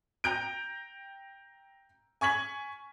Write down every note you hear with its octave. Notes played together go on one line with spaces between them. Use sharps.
G5 A#5 G6 D7
G#5 C#6 G#6 B6 F#7